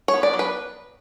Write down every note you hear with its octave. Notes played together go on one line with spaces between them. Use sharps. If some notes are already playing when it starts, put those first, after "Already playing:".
C#5
B3
D5
F#3
B4